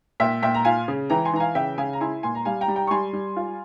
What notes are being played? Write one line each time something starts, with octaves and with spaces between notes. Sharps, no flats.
A#2 E5 G5
A#2 E5 G5
A#5
F4 F5 G#5
C#3
E3 G5 A#5
G#5 C6
E3 A#5
F5 G#5
C#3 E5 G5
C#3 F5 G#5
A#5
E4 G#5 C6
A#2 G#5 C6
A#5
G3 F5 G#5
G5 A#5
G3
G5 A#5
C#6
G3 G#5 C6
G3
F4